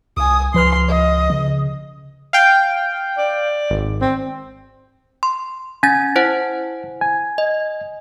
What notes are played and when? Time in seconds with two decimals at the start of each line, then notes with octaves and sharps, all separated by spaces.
0.17 C2 G#5 D#6
0.54 C#2 F3 B4 C6 F6
0.88 D#5
1.30 C#3
2.33 F5 G5
3.18 D5
3.70 G#1
4.01 C4
5.23 C6
5.83 C#4 G#5 A6
6.16 E4 C5 F#5
7.01 G#5
7.38 D#5